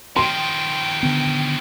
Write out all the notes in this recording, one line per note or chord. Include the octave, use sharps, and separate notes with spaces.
D#3 F3 G5 C6
D3 B3